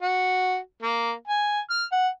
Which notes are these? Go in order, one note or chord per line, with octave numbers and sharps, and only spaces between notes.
F#4
A#3
G#5
F6
F#5